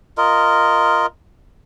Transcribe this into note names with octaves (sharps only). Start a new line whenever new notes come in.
F4 A#4 D#5